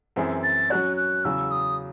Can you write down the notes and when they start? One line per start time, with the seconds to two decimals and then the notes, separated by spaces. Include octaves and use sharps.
0.16 F#2 E3 C4 E4 G#4
0.43 A6
0.70 F#3 C#4 F#4 C#5 F#6
0.97 F#6
1.24 E2 C#3 F#3 E6
1.51 D#6